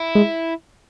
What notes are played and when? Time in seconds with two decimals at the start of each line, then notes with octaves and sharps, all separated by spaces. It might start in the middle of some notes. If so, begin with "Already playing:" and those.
Already playing: E4
0.15 G#3